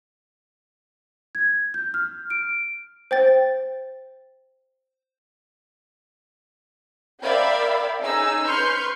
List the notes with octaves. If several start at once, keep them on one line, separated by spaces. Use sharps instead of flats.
G#6
G6
F6
D7
C5 G5 A6
A#4 D5 E5 F5 G5 B5
C#4 D#4 G#4 E6
B4 C6 C#6 F6 G6